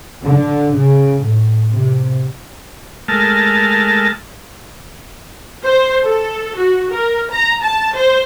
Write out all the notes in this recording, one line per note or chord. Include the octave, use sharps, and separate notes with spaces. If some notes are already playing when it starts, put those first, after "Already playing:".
D3
C#3
A2
C3
G#3 A3 A#4 A5 F6
C5
A4
F#4
A#4
A#5
A5
C5